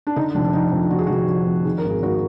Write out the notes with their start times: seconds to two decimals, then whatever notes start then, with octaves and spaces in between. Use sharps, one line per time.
0.07 D4
0.16 D3 D#4
0.35 F1 D4
0.53 F1 D#4
0.72 F2
0.91 D3 F#4
0.99 G#4
1.07 F1 F#4
1.28 F1
1.47 F2
1.65 D#3 G#4
1.78 A#4
1.84 G#1
1.90 G#4
2.03 G#1 F#4